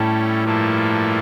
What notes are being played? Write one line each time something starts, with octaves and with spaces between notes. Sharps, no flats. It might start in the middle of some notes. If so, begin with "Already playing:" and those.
Already playing: A2 G3 A3 C#4 E4 A4
G2 F3 A#3 E4 A4